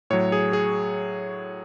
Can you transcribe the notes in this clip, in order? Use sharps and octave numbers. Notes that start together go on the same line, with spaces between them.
A2 F#3 C#5
G#4
G#4